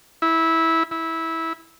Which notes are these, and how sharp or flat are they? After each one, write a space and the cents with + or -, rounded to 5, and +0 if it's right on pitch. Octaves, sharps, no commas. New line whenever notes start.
E4 -15
E4 -15